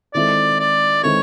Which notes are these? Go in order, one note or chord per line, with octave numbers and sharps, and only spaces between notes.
D#3 G#3 C4 E4 A4 D5
D5
D#3 G#3 C4 E4 A4 C#5